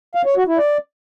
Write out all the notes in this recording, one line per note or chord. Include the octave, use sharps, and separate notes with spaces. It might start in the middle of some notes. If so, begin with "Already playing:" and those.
F5
C#5
F#4
E4
D5